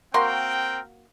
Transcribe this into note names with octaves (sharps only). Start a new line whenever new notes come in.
A#3 C4 F#4 A#4 G5 C6